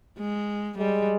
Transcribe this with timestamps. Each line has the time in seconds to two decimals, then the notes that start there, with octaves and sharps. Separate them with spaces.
0.18 G#3
0.78 G3 G#3